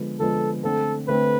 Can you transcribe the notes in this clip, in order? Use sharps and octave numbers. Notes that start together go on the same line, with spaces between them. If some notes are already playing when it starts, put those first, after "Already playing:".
Already playing: D3 F3 G#3 B3
D3 F3 G#3 B3 A4
D3 A3 C4 A4
D3 A3 C4 B4